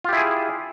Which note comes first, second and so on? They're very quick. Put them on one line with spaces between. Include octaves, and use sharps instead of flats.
F4 G4 E4 G#4